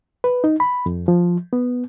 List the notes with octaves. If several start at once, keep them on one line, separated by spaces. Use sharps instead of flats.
B4
D#4
B5
F2
F3
B3